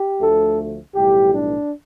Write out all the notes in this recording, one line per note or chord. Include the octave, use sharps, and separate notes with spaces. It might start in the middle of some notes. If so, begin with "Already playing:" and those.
Already playing: G4
D2 D3 F3 A3 A4
B1 A2 E3 G3 G4
D4